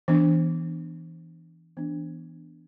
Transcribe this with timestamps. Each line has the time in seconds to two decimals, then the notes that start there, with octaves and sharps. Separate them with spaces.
0.08 E3 B3 D4
1.77 E3 B3 D4